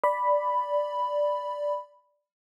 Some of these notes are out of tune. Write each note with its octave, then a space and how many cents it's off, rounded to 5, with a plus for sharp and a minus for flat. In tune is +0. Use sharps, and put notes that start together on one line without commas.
D5 +0 B5 +0